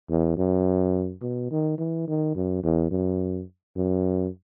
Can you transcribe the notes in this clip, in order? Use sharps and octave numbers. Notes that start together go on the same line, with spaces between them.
E2
F#2
B2
D#3
E3
D#3
F#2
E2
F#2
F#2